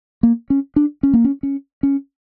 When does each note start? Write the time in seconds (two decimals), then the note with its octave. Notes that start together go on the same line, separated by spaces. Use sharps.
0.23 A#3
0.50 C#4
0.76 D4
1.03 C#4
1.13 A#3
1.24 C#4
1.43 C#4
1.83 C#4